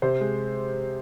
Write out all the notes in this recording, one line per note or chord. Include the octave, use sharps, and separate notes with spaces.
C3 C5
G#3